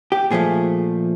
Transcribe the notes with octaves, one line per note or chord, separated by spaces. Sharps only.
G4
A#2 F3 A3 G#4